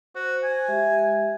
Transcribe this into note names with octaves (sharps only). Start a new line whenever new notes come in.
F#4 C5
G#5
G#3 G4 E5